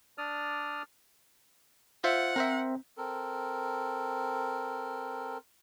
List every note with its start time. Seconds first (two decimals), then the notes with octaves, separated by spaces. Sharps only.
0.18 D4 D5 D#6 F6
2.04 F4 C5 E5 F#5
2.36 C4 A#4 C5 E5
2.98 C4 A4 A#4